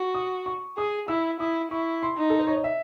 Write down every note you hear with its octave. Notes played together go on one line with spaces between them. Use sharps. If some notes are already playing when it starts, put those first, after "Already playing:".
Already playing: F#4
D#6
C#6
G#4 D#6
E4 E6
E4 D#6
E4 C#6
C6
D#4
A4
C5
C#5
D#5
E5